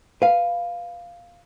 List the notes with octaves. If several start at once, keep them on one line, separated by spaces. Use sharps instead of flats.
B4 F5